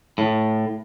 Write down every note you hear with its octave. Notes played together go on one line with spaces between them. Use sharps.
A2